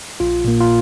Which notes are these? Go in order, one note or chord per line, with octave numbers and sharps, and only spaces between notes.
A#1 F4
A#2 A#3
F4